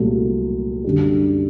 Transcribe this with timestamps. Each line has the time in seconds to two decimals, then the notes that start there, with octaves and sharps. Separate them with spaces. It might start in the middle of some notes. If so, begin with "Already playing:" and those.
Already playing: C2 A#2 F#3 A3
0.84 F#2 D3 G3